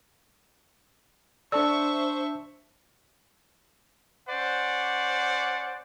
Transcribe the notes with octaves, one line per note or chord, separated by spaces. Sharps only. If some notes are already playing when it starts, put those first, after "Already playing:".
D4 A4 C5 D5 E5 A5 C#6 E6
C#4 C5 D5 F#5